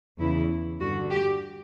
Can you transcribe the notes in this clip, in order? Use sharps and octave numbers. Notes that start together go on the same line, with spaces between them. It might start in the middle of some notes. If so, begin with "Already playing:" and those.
E2 C#3 E3 E4
G2 D3 F#4
G4